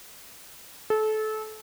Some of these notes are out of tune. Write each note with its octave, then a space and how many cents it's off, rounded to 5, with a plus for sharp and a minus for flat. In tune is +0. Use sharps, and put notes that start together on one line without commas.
A4 -25